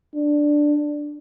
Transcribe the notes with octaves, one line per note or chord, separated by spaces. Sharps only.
D4